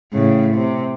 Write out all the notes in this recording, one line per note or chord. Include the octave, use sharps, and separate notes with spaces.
A2 C#3
C3